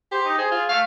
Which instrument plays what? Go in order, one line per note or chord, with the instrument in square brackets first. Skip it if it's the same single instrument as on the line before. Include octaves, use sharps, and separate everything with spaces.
[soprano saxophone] G4 [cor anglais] C5
[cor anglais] D#4
[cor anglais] G#4 [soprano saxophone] C5
[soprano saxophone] F4
[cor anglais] A3 [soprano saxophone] F5